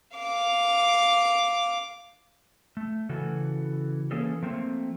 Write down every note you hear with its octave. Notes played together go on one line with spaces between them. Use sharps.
F5 D6
A3
C#3 E3 F#4 A4
E3 A#3 C#4 G#4 A4
F3 A3 A#3 C4